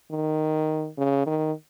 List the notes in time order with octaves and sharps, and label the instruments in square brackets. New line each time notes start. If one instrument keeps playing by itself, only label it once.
[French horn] D#3
C#3
D#3